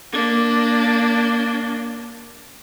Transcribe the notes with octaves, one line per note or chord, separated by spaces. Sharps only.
A#3 D4